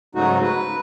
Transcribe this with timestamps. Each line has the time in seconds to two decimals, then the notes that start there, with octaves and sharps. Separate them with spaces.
0.15 G#2 C#3 F#3 A3 D#4 F#4
0.43 B4